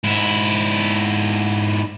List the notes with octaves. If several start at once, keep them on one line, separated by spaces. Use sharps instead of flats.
G#2 E4